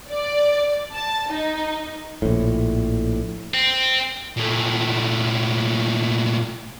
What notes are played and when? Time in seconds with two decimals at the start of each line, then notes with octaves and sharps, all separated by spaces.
0.10 D5
0.93 A5
1.31 D#4
2.22 A#1 A2
3.54 C4
4.37 A#2 A3